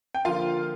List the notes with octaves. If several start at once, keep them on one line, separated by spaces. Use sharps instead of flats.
G5
D3 F3 A#3 F4 F5